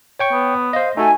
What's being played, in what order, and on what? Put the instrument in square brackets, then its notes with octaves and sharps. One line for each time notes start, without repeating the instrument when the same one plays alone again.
[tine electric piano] C#5 G5 C#6
[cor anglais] B3
[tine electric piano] C5 D#5 [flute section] F5
[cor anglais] A3 [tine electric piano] D#4 F#4 [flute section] G#5